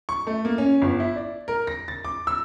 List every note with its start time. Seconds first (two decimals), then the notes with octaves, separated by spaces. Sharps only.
0.09 C#6
0.27 A3
0.45 A#3
0.58 C#4
0.82 G1
1.00 E4
1.16 D5
1.48 A#4
1.67 A#6
1.88 A6
2.05 D6
2.27 E6